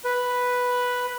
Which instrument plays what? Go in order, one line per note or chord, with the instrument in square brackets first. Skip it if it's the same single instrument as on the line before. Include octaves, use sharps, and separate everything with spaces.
[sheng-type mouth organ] B4